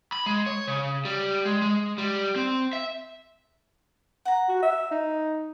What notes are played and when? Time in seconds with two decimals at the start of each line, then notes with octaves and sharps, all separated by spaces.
0.13 B5
0.26 G#3
0.46 C#5
0.67 C#3
1.05 G3
1.45 G#3
1.62 G#3
1.98 G3
2.36 C4
2.73 E5
4.25 F#5 A#5
4.49 F#4
4.63 E5
4.91 D#4